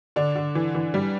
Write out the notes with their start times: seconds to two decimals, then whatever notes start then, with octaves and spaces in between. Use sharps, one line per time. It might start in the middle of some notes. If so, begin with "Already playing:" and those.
0.16 D3 D4
0.35 D3
0.55 E3
0.75 E3
0.94 G3